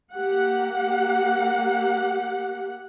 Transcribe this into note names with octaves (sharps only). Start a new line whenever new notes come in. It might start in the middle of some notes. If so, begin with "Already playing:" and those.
A#3 G4 F#5